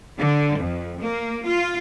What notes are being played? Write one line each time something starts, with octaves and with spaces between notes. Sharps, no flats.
D3
F2
A#3
F4